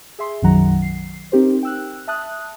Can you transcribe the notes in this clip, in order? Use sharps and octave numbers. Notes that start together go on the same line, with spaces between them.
G#4 E5 C6
B1 F#2 D#3 F#3 F#5 A#5
C7
C4 D#4 G4 A#4 C5
G5 E6 F#6
E5 A5 D#6 F#6